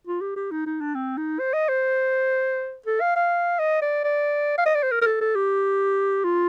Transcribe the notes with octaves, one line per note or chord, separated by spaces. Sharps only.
F4
G4
G4
D#4
D#4
D4
C4
D#4
C5
D#5
C5
A4
F5
F5
D#5
D5
D5
F5
D#5
D5
C5
A#4
A#4
A4
A4
G4
F4